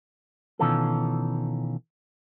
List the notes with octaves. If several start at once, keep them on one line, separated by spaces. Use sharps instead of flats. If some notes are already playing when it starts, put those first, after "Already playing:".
B2 D#3 E3 C#4 F4 A4